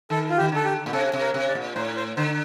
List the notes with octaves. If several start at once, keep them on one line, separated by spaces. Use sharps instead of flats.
D#3 A4
F4
D#3 G4
D3 A4
G4
A#2
C3 A4
C3
A#4
C3
D5
A#2
A2 C5
C5
D3 C5